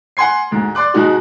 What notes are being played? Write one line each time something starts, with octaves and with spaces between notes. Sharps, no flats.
F#5 G#5 C6 G#6 C7
D2 G#2
D5 C6 D6 F#6
G#2 B2 G#3 D#4 F#4